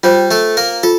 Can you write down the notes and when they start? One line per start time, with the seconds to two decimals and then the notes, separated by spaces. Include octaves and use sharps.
0.03 G3 F4 G4 C5 G5
0.31 A3 A4
0.57 A#3 A#4
0.83 F4 A4